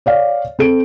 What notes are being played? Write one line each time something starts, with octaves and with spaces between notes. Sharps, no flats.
C#5 D5 F5
C4 A4 D7